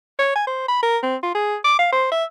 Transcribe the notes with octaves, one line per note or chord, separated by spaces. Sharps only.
C#5
G#5
C5
B5
A#4
C4
F4
G#4
D6
F5
C5
E5